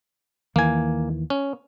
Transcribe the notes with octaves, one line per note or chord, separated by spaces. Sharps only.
D#2 D#3 E3 A#3 G#5
C#4